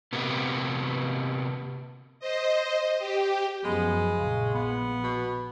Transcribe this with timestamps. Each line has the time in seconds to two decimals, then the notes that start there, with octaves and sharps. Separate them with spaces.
0.13 C3 A#3 B3
2.20 C5 D#5
2.99 G4
3.64 F#2 F3 G#3 B3
4.17 A#1 C#3
4.54 B3
5.04 B2